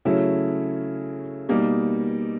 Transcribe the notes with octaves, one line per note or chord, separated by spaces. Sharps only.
C#3 F#3 A3 C#4 E4
B2 G3 A#3 D#4